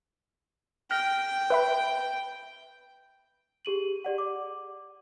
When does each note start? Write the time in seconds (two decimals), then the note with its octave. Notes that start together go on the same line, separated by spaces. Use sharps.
0.91 G5 F6 A#6
1.50 B4 E5 B5
3.65 G4 G#4 D#7 F#7
4.05 G4 D5 F#5
4.18 D6